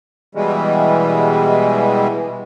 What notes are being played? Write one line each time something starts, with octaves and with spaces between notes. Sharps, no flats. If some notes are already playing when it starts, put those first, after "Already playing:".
B2 E3 G3 G#3